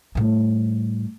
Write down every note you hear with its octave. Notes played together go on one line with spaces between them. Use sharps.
A2 G3